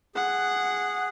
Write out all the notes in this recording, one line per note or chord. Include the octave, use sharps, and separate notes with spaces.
G#4 F#5